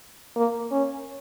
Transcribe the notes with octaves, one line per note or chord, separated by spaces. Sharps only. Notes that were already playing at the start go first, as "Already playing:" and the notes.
A#3
C#4